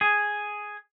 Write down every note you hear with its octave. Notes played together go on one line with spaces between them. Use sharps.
G#4